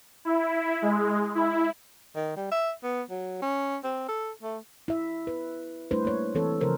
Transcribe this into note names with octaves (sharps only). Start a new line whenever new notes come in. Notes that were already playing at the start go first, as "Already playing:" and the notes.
E4
G#3
E4
D#3
G3
E5
B3
F#3
C#4
C4
A4
A3
E4 E5
B4
G3 A3 D4 E4 B4 C5
A#3 C#5
E3 C4 A4 C#5
C#3 F3 A#4 C5